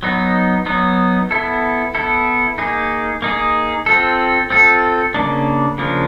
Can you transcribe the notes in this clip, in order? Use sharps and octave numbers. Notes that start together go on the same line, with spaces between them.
F#3 B3 D#4
F#3 B3 D#4
B3 E4 A4
B3 E4 A4
A#3 D#4 G#4
A#3 D#4 G#4
C4 F4 A4
C4 F4 A4
C#3 F3 A#3 D4
C#3 F3 A#3 D4